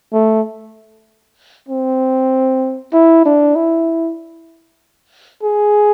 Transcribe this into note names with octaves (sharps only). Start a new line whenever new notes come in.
A3
C4
E4
D4
E4
G#4